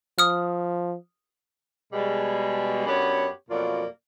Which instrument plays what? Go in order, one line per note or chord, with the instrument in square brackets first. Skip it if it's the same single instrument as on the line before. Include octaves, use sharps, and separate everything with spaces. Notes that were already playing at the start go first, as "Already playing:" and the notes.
[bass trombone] F3 [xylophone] D#6 F6
[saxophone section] B2 G3 G#3
F#2 B3 D4 G4 C#5
F2 B2 F#3 A#3 F4 D5